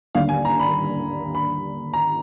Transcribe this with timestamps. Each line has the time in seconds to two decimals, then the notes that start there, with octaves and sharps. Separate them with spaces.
0.15 D#2 D3 G3 F5
0.29 G#5
0.45 A#5
0.59 B5
1.35 B5
1.94 A#5